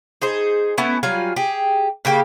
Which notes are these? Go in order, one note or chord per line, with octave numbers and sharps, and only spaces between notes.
D#4 G#4 C5
A3 B3 C#4 E4
F#3 G3 F4 G#5
G4 G#4
C#3 A#3 G4